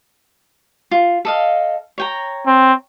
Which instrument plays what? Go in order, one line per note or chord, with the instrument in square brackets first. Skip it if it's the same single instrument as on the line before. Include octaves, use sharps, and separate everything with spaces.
[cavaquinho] F4
A4 D#5 F5
C#5 G5 A#5
[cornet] C4